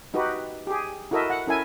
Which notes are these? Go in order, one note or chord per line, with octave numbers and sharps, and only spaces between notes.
D#4 F#4 G4 B4
G4 G#4
E4 F#4 A4 A#4 D#5 E5
F#5
C#4 E4 A4 A#4 E5 G#5